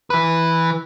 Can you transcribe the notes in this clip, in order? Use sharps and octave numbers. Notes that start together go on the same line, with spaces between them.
E3 B4